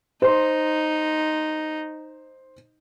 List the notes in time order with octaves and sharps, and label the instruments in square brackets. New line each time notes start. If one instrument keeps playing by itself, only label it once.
[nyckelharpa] D#4 [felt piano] C5 C6